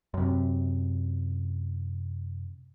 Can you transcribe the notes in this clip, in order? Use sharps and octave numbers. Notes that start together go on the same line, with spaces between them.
F#2 C3